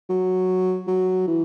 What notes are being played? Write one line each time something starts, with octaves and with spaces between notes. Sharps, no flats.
F#3
F#3
E3